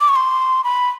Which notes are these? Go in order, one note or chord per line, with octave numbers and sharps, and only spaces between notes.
D6
C#6
C6
B5